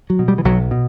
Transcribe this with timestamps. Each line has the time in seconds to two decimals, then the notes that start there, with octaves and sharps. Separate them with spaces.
0.10 F#3
0.19 B2
0.28 G3
0.38 E3
0.45 B1 F#3
0.71 B2